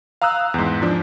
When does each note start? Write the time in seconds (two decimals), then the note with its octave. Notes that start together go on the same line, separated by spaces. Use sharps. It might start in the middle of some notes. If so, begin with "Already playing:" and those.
0.22 F5 A#5 D#6 E6 F#6
0.54 E2 G#2
0.82 F3 D4